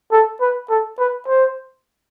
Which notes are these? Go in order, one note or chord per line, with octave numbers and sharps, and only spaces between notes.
A4
B4
A4
B4
C5